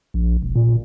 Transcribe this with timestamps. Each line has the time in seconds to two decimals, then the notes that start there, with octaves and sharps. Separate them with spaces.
0.14 A#1
0.42 E1
0.55 A#2